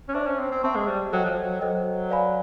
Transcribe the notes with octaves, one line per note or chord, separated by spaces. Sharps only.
C#4
D4 C5 E5 A5 C#6
C#4
C4
C4
C4 C5 E5 A5 C#6
G#3
G3
F#3 A4 C5 D#5 G5
F3
F#3
F#3 A4 C5 D#5 G5
B4 D5 F5 G#5 B5